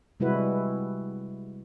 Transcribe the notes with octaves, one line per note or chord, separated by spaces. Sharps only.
C3 G3 G#3 E4 F#4 B4